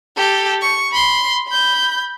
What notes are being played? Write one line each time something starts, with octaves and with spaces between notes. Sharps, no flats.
G4 A4
C#6
B5 C6
B5 G6